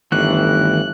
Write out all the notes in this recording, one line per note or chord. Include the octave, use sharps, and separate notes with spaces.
G1 D#3 E3 A3 F#6